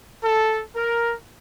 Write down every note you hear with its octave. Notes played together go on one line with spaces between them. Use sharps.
A4
A#4